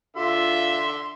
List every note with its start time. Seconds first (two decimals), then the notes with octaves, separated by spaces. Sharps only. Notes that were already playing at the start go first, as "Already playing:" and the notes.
0.17 D3 F4 E5 C6